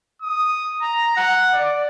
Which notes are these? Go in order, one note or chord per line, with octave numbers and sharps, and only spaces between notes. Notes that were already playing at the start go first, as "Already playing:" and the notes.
D#6
A#5
F#5
D5